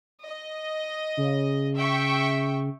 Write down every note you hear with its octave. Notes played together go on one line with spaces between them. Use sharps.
D#5
C#3
E5 G5 C#6